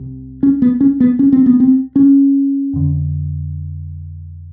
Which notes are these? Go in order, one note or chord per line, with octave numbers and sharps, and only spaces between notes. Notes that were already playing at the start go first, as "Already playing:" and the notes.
Already playing: C2 C3
C#4
B3
C#4
B3
C#4
C4
B3
C4
C#4
F2 D3